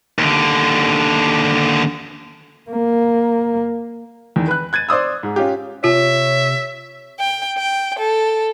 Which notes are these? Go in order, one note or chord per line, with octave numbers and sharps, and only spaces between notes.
D#2 D3
A#3
E2 D#3
B4 F#6
F#6 G#6 A6 D#7
C5 D5 D#6 E6
G#2
C#4 F4 G4
C3 F4 C#5 E5
G5
G5
A4